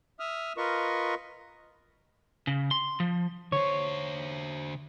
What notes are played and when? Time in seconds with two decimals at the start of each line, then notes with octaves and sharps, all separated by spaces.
0.20 E5 D#6 F6
0.57 F4 A#4 B4 D#5 C#6
2.47 C#3
2.71 C6
3.00 F3
3.52 D3 C5 C#5